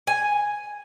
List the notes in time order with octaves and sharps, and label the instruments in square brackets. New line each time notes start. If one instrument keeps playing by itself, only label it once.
[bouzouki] G#5